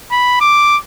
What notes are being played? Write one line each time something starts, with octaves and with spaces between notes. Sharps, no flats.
B5
D6